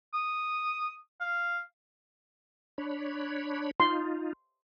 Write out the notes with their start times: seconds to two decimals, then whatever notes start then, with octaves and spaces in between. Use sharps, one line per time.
0.14 D#6
1.21 F5
2.78 D4 C#5 B5
3.80 D#4 F4 C6